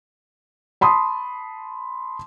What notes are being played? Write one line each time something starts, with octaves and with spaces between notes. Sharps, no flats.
A5 B5 C6 D#6